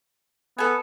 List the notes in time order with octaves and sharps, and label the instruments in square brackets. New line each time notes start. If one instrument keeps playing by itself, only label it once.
[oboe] B3 [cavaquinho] A4 G#5